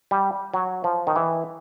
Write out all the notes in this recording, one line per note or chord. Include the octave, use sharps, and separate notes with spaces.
G3
F#3
F3
D#3
E3